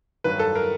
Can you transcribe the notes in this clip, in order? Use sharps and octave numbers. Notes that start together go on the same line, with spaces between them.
G2 D#3 F#3 B4
A4
A#4